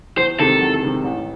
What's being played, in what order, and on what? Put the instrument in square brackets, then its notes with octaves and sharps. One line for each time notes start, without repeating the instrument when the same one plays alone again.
[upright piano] E2 [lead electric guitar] C5
[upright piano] C3 D#3 G#3 [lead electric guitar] A4
[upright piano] E2
C3 D#3 G#3
A1